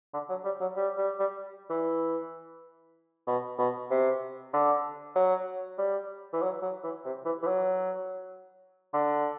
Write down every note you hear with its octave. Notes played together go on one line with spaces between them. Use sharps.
D3
F#3
G3
F#3
G3
G3
G3
E3
B2
B2
C3
D3
F#3
G3
E3
F#3
F#3
E3
C3
E3
E3
F#3
D3